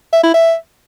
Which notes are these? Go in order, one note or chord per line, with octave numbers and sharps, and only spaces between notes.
E5
E4
E5